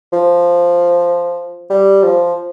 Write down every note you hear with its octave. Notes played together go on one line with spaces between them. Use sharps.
F3
G3
F3